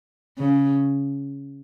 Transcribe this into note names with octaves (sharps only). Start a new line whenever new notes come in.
C#3